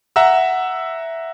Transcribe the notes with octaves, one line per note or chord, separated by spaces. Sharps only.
E5 F#5 A#5 E6